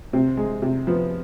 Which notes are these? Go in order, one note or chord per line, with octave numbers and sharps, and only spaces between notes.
C3 C4
G#3
C3
F3 B3